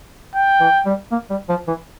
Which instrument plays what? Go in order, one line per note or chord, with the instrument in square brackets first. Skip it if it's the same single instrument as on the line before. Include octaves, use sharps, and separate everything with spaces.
[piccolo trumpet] G5
[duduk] E3
G3
A#3
G3
F3
E3